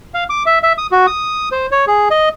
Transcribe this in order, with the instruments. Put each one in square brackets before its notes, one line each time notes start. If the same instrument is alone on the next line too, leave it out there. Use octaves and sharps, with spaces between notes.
[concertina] F5
D6
E5
E5
D#6
F#4
D#6
C5
C#5
G#4
D#5